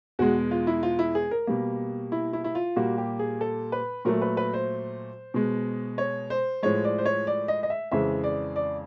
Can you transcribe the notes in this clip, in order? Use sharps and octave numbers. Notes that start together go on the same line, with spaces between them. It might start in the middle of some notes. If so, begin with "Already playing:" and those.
E2 B2 G#3 F#4
F4
E4
F4
E4
G#4
A#4
B2 G3 A#3
E4
E4
E4
F4
A#2 G3 A#3 F#4
G4
G#4
A4
B4
A#2 F#3 A3 A#4
B4
B4
C5
B2 G#3
C#5
C5
A2 F3 G#3 C#5
D5
C5
C#5
D5
D#5
D#5
E5
F2 C#3 E3 G#3 E5
D5
D5